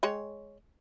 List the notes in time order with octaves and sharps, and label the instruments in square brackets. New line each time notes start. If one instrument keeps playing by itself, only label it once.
[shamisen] G#3 C#5 G5